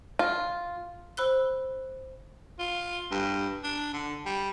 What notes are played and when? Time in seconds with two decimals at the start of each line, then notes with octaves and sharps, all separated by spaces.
0.19 F4
1.17 C5 B5 E6 F#6 G7
2.59 F4
3.11 G2
3.64 D4
3.93 D3
4.26 G3